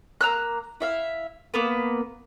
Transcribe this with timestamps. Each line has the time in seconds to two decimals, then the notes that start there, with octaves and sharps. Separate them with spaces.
0.21 A#3 A#5 E6 F#6
0.80 E4 E5 F5
1.54 A#3 B3 B4